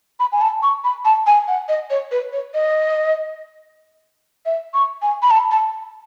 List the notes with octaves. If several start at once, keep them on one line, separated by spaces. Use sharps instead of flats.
B5
G#5
A5
C#6
B5
A5
G#5
F#5
D#5
C#5
B4
C#5
D#5
E5
C#6
G#5
B5
A5
A5